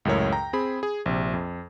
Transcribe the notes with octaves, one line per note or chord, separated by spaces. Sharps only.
C#2 F#2 A2 A#4 C#5
G5 A#5
C4 G#4 B5
G#4
A#1 C3
F2